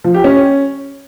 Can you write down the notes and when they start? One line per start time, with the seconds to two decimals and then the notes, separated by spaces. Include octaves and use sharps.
0.04 F3
0.14 G4
0.24 C#4